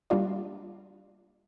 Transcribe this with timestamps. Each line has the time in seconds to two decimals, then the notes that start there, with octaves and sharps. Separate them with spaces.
0.10 G3 A#3 D4 F4 D5